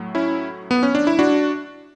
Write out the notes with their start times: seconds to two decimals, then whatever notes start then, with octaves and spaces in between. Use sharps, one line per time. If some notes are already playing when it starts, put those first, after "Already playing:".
Already playing: A2 F#3 A3
0.15 C#4 E4
0.71 B3
0.83 C#4
0.95 D4
1.07 E4
1.19 D4 F#4